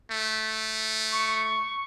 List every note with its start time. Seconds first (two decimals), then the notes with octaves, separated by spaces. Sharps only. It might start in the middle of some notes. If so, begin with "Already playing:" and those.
0.11 A3
1.12 C#6